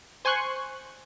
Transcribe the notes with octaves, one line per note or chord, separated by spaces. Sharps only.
C5 G#5 C6 C#6 F#6